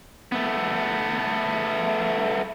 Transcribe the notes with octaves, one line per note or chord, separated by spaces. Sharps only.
A3 B3